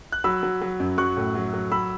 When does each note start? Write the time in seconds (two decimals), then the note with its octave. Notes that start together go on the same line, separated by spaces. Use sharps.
0.12 F#6
0.24 F#3 B5 E6
0.43 F#3
0.62 F#3
0.80 F#2
0.98 F#3 C#6 F#6
1.17 A2
1.35 F#3
1.54 F#3
1.72 F#3 B5 E6